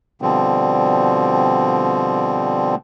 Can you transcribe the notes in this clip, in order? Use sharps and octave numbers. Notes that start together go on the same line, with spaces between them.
B2 D3 F3 G3 C4